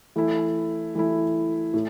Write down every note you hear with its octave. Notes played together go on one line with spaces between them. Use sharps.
E3 A3 E4
E3 A3 E4
A2